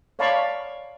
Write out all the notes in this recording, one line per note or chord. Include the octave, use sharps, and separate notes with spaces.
C#5 D5 F5 A5 B5 C#6